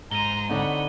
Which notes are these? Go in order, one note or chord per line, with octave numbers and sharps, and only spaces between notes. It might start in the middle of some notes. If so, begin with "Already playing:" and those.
G#2 A#5 C6 D#7 G7
D3 C4 D#4 C#5 F#5 B5